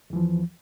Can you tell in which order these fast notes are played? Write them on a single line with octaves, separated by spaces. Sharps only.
E2 E3 F3